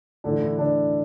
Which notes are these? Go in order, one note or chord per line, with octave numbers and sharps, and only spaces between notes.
A2 D3 E3 D4
E3 E4
D3 D4